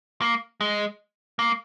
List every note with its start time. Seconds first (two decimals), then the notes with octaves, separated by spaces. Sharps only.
0.21 A#3
0.61 G#3
1.39 A#3